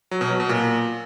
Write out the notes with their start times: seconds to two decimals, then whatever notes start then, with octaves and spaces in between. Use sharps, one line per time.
0.11 F#3
0.21 B2
0.30 F#3
0.40 B2
0.49 A#2